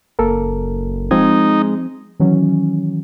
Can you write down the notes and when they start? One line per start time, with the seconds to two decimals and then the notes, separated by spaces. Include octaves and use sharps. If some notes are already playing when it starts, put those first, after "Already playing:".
0.19 F#1 A#3 A4 A#4
1.11 F3 G#3 C4 D#4 G#6
2.20 D#3 E3 F#3 C#4